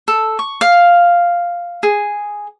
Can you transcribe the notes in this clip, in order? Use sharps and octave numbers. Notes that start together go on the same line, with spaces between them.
A4
C#6
F5
G#4